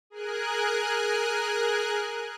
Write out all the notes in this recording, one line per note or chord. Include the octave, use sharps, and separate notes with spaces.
G#4 A#4 G#5 F#6